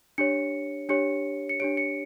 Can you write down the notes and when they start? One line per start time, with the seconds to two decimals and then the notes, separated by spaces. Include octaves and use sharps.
0.18 D4 G4 C#5 C#7
0.89 D4 G4 C#5 C#7
1.49 C#7
1.60 D4 G4 C#5 D7
1.77 C#7